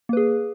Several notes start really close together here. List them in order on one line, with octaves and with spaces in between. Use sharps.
A#3 B4 G#4